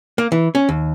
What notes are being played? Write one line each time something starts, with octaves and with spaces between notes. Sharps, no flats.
A#3
E3
C#4
D#2